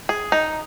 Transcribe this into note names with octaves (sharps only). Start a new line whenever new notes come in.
G#4
D#4